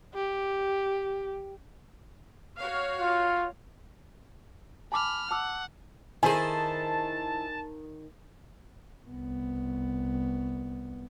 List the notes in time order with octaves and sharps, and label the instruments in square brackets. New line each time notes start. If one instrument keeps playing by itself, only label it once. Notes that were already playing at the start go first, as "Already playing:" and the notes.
[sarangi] G4
[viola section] F#4 C#5 F5
[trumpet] F4
[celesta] G#5 A5 D6 [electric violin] B5 F6
[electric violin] F#5 [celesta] A5 D6 E6
[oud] D#3 G#4 [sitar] E4 C5 [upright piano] G#5 [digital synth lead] A5
[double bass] C2 B3